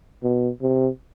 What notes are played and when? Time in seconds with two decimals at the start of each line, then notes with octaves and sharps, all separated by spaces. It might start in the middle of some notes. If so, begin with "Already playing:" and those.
0.23 B2
0.62 C3